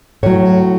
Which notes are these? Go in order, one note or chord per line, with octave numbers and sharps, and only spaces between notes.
A2 F#3 C#5